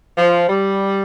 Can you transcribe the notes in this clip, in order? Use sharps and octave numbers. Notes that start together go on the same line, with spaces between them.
F3
G3